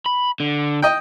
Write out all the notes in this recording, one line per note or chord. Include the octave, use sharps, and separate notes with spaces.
B5
D3
D#5 G5